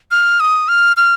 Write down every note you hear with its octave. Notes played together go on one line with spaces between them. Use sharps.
F6
D#6
F6
F6